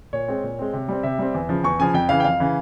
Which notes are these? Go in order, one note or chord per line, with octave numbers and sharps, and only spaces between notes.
A#2 C#5
G#3 C4
A#2
G#3 C4
C3
G3 C4
C3 E5
G3 C4
E2
C#3 F3
E2 C#6
C#3 F3 G#5
F2 G5
C#3 E3 F5
G5
F2 F5
C#3 E3